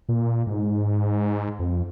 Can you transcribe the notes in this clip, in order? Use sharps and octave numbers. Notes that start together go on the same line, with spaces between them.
A#2
G#2
F2